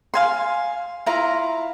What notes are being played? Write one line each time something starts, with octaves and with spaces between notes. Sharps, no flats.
F5 G#5 C6
E4 F4 F5 A#5